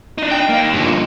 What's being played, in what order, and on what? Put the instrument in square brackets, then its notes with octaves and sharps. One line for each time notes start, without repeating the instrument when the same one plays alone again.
[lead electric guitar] D4 D#4
[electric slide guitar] G5
[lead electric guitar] A#3 D#4
[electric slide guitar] G2 D3 F3